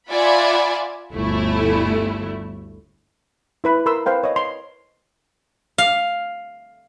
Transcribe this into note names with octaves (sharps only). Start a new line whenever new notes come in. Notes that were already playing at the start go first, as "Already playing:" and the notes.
F4 D5 E5 F#5 G#5 B5
G1 D2 A3 E4
E4 B4 B5
A#4 B5 C6 E6
B4 C5 F5 G5
C#5 D#5
C6
F5